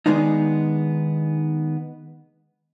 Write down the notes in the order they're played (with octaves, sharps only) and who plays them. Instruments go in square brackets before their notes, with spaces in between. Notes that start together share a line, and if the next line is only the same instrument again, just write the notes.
[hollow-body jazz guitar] D#3 G#3 B3 D4 D#4